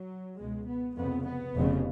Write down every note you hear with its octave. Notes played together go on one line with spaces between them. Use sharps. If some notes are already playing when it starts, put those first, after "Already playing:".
Already playing: F#3
C#2 B2 G#3
B3
F1 F2 C#3 B3
B3
F1 F2 C#3